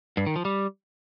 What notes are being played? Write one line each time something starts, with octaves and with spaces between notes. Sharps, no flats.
G2
D#3
F3
G3